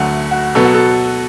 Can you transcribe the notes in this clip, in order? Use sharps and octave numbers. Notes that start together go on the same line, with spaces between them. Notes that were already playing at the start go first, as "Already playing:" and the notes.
Already playing: D2 D3 F#3 A3 F#5
F#4
B2 F#3 B3 A4
F#4
A4